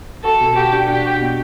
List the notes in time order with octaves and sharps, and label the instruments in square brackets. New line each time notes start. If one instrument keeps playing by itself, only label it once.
[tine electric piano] F#4 [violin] A4
[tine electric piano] B2
[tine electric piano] F#4 [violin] G4
[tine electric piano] D4
[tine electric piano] D4 [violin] G4
[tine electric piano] F#4
B2